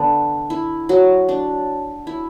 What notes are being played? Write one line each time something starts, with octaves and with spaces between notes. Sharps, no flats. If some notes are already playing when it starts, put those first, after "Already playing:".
Already playing: D3 B3 D4
E4
F#3 F#4
D4
E4